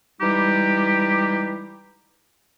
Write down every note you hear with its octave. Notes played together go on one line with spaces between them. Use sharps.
E3 G3 G#3 D#4 G4